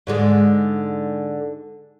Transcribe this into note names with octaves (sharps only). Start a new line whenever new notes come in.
G#2 D3 G#3